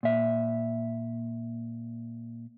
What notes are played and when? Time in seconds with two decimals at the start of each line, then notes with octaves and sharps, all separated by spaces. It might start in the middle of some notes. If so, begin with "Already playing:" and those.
0.03 A#2 E5